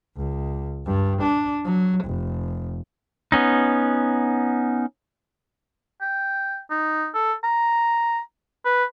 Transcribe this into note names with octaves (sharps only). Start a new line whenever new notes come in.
C#2
G2
D4
F#3
F1
B3 C#4 D#4
G5
D#4
A4
A#5
B4